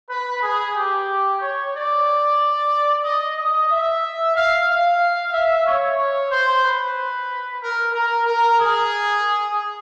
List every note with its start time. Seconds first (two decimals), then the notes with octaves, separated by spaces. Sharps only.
0.10 B4
0.42 G#4
0.75 G4
1.40 C#5
1.74 D5
3.04 D#5
3.37 D#5
3.70 E5
4.35 F5
4.68 F5
5.33 E5
5.66 C#5
5.98 C#5
6.31 C5
6.64 B4
7.61 A#4
7.94 A#4
8.26 A#4
8.60 G#4